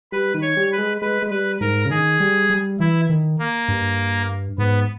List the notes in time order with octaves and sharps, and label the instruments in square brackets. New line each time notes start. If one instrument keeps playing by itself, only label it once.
[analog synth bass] G3 [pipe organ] B4
[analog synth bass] D#3
[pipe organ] C#5
[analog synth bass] G3
[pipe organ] B4
[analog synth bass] G#3
[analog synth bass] G#3 [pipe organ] B4
[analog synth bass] G#3
[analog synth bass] G3 [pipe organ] B4
[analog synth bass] G#2 [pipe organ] A#4
[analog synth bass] C#3
[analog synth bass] D#3 [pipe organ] G#4
[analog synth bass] G3
G3
[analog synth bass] E3 [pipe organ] E4
[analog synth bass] D#3
[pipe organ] A#3
[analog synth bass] G2
[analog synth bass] G#2 [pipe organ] B3